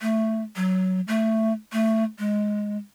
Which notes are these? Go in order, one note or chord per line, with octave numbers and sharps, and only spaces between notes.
A3
F#3
A3
A3
G#3